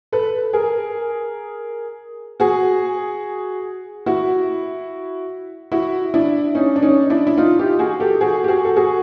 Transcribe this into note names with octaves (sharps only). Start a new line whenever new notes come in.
A4 B4
G#4 A#4
F#4 G#4
E4 F#4
E4 F#4
D4 E4
C#4 D#4
D4
C#4 D#4
D4 E4
E4
D#4 F4
F4 G4
F#4 G#4
G4 A4
F#4 G#4
G4
F#4 G#4
A4
F#4 G#4